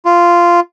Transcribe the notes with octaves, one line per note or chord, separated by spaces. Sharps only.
F4